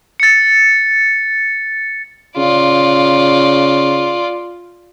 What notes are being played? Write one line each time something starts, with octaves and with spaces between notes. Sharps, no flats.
A6 C#7
C#3 F4 D5